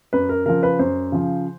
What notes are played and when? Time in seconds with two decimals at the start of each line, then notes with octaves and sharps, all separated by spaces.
0.13 F#2 B4
0.29 A#4
0.46 C#3 F3 A#4
0.63 B4
0.79 F#2 C5
1.12 C#3 F3